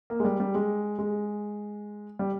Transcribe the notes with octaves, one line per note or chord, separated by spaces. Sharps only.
A#3
G#3
G3
G3
G#3
G#3
G3